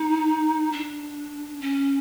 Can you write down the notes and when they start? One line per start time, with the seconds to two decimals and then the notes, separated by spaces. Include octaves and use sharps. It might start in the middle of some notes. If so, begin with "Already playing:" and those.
Already playing: D#4
0.72 D4
1.61 C#4